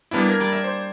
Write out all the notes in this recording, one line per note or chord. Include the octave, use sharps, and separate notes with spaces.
G3 A#3 B3 D4 E4 E5
A#4 G#6
G3 D5
E5
C5